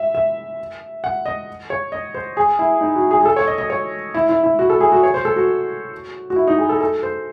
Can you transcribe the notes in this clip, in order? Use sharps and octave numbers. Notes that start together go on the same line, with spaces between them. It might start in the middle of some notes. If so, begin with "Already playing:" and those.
Already playing: E5
E5
F#5
D#5
C#5
D#5
C5
G#4
E4
D#4
F#4
G#4
G#4
A4
C#5
D#5
D#5
C#5
E4
E4
E4
F#4
A4
G#4
F#4
C#5
C5
A4
F#4
F#4
E4
D#4
G#4
A4
A4
C5